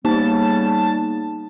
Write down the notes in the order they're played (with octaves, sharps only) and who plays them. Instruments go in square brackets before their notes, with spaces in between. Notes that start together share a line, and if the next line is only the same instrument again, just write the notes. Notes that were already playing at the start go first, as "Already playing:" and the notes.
[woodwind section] C#3 G3 B3 [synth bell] A#3 D#4 [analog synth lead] A5